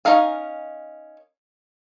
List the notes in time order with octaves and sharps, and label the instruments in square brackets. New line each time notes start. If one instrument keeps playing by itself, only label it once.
[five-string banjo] C#4 D#4 A#4 F5 G#5